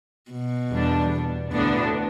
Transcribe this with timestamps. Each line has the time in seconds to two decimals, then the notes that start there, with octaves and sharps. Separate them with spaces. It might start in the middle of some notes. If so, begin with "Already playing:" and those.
0.31 B2
0.71 E2 D3 G3 D4
1.52 D2 A2 D3 B3 D4